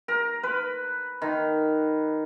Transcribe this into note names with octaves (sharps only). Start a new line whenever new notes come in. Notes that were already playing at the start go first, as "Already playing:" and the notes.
A#4
B4
D#3